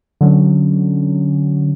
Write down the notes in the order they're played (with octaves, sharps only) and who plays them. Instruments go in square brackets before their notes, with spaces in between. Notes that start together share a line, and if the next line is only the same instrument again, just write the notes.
[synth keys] D3 F#3 C#4